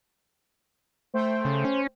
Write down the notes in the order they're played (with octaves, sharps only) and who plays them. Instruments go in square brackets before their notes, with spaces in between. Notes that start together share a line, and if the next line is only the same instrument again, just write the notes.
[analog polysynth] A3 G5 [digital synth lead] C5
[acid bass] C#3
C#4